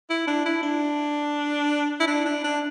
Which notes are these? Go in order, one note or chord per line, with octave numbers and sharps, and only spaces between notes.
E4
D4
E4
D4
E4
D4
D4
D4